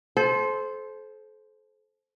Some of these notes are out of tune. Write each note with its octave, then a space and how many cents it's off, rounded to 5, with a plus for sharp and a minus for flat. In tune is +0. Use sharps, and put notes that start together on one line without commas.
A4 -35 C5 +0